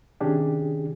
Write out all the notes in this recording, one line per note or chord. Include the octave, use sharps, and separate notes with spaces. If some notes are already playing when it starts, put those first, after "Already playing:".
C3 D#3 C#4 D4 G4 G#4